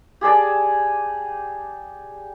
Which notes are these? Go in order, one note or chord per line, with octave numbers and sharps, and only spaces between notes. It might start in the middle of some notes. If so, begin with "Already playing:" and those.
G4 G#4 D5 A5